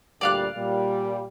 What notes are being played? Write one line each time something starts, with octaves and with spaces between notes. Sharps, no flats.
D2 A#2 G3 D5 F5 F#6
A#2 G3